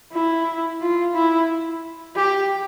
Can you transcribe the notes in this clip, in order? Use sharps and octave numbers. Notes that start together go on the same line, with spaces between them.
E4
F4
E4
G4